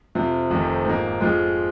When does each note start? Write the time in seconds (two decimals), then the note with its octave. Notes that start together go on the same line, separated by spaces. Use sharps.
0.15 F2 C3 F3
0.50 F1 F2 C3 D#3
0.85 G#2 F3 A#3
1.20 F2 F3 G#3 F4